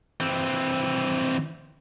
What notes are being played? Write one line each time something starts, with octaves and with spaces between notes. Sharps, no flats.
E3 C4